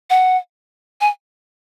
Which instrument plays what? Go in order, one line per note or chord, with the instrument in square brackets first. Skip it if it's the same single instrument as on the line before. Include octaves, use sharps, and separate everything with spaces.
[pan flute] F#5
G#5